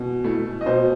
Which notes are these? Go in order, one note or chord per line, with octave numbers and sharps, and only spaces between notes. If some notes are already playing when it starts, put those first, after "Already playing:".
Already playing: B2
A3 E4
D#5
B2 C5